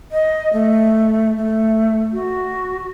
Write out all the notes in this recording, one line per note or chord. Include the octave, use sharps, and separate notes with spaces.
D#5
A3
A3
F#4